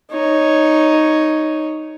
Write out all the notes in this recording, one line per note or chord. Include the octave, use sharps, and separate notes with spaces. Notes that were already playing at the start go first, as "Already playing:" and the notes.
D#4 C#5